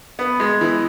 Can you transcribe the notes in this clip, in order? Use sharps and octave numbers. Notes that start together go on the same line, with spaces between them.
B3
G#3
E3